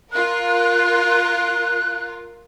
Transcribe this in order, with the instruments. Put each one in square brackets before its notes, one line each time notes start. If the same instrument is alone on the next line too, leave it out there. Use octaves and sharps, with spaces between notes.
[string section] F4 A#4 [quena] F#6